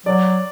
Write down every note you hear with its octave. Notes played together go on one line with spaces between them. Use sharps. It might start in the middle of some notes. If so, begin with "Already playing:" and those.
F#3 D5